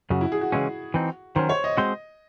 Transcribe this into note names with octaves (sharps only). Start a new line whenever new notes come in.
F#2 C#3 F#4
E4
G#4
F#4
C#3 E3 G#3 C#4
E3 C4 D#4
D#3 F#3 C#4 C5
C#5
D#5
G#3 C4 F#4 C5